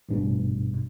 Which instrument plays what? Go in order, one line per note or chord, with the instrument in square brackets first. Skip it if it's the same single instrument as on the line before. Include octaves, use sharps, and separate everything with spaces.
[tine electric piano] A1 G2 B2